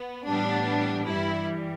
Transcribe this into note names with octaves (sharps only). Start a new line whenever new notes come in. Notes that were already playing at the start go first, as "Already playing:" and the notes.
Already playing: B3
A2 E3 G3 B3 D4
G2 E3 G3 E4